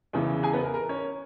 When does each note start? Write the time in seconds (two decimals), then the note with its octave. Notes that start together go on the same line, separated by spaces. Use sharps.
0.13 E2 C#3 E3
0.43 G#4 G#5
0.53 B3 B4
0.64 A#4
0.74 A#4
0.89 C#4 C#5